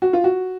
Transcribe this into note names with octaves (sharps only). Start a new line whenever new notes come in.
F#4
F4
F#4